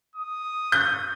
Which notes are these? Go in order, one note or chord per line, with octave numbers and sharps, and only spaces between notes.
D#6
G6